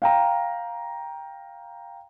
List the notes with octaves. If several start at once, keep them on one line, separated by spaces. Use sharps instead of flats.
F5 G5 A#5